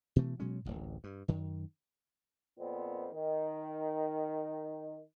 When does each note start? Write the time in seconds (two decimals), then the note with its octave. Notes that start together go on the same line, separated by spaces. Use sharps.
0.16 B2 E3 A3
0.40 B2 F#3 G#3 C#4
0.65 D1 A1 A2
1.04 G2
1.28 F#2 D#3
2.59 F2 A#2 B3 C4
3.14 D#3